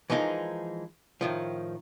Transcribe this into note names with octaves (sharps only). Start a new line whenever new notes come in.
E3 F3 G#3 D#4 A#4
A2 D#3 F3